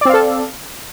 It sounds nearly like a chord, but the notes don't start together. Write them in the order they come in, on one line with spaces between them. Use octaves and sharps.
D5 C4 F5 A4